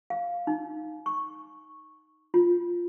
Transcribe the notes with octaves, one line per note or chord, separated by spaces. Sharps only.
F5
D#4
C#6
F4